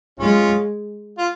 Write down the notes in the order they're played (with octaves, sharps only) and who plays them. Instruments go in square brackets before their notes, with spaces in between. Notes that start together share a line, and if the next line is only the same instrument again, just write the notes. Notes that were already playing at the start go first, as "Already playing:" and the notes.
[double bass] G#3 [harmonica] C#4 F4
[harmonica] F4